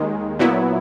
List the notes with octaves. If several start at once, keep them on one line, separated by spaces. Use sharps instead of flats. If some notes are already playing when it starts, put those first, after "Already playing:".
Already playing: D#2 D#3 G#3
A#2 F#3 B3 E4